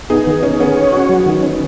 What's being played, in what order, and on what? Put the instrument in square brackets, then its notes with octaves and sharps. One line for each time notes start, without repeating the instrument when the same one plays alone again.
[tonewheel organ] B3 [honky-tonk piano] D#4 G#4
[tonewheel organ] D#3
[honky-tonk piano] C#4 [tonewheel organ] G#4
[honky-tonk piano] B3 [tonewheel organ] C#4
[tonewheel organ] C#5
F#4
F#3
D#3
C#4